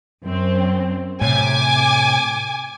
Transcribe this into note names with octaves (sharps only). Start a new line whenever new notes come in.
F#2 C4
A2 C3 G#5 D6